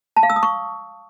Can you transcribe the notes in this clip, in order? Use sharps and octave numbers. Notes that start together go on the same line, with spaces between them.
A5
F5
E6
D#6
C#6